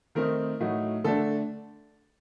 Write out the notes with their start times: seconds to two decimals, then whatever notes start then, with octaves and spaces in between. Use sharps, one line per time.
0.15 D#3 A3 C4 D#4 A#4
0.60 A2 F#3 A3 D#4
1.04 D3 A3 D4 A4